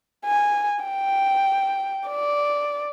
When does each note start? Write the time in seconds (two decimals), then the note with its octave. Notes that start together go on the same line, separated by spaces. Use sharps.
0.25 G#5
0.84 G5
2.08 D5